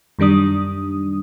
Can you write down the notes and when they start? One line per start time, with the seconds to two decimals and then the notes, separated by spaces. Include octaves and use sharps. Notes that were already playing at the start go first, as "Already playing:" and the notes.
0.19 F#2 D#3 G3 D4 D#6